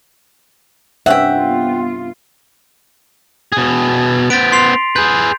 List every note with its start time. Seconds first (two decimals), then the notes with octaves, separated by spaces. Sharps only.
1.06 G2 C3 C#4 E5 F#5 G5
1.37 B3 F4
3.52 B2 G#4
4.30 B3 C5 A6 B6 D7
4.52 C6 C7 F7
4.96 G#4 B4 G6